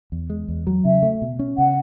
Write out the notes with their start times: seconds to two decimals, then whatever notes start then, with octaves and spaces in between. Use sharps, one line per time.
0.12 E2
0.30 G#3
0.48 E2
0.67 F#3
0.85 C#3 E5
1.02 A3
1.22 B2
1.39 C#4
1.58 C#3 F#5